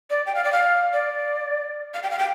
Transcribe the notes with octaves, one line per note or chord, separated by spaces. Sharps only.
D5
G5
F5
D5
F5
D5
F5
G5
F5
G5